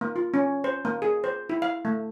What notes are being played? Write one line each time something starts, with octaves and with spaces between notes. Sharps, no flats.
A#3
F4
C#4
C5
A#3
G#4
C5
E4
F5
A3